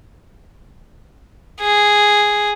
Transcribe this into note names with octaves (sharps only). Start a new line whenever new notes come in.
G#4